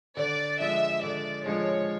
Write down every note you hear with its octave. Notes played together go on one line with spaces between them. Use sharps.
D3 D5
F3 G#3 E5
D3 D5
F3 G#3 C#5